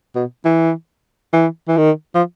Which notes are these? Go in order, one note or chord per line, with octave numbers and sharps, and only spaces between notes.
B2
E3
E3
E3
D#3
F3